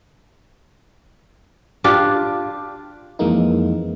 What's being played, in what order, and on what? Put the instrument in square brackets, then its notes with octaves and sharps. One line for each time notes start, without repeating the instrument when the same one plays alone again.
[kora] D4 F4 G4 D5
[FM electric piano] F2 E3 G#3 A#3 D#4